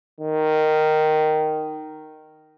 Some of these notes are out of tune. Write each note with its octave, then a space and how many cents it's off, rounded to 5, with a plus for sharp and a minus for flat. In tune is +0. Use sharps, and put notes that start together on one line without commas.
D#3 -5